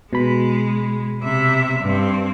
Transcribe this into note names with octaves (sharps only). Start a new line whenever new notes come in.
B2 G#3 B5
C3 E5
G2 C4